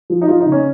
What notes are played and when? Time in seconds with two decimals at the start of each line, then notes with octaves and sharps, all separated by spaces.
0.10 F3
0.22 D#4
0.28 F3 F4
0.41 D#4
0.46 C#3
0.52 C#4